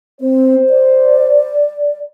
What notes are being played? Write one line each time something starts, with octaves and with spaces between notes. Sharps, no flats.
C4 C5
D5